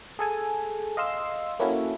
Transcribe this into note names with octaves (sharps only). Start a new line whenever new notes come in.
G#4 A4 G#5
D#5 F5 C6 E6
A#3 C#4 E4 F#4 A4